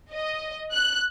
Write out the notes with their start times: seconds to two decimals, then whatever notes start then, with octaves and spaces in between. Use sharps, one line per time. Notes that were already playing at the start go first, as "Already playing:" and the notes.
0.12 D#5
0.72 F#6